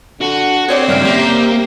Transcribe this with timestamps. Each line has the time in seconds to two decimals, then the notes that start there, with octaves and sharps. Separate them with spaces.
0.21 D3 F#4
0.68 C4 G#4 C#5 D5
0.88 G2 C#3 D4 A#4 E5
1.05 A#3 G4 E5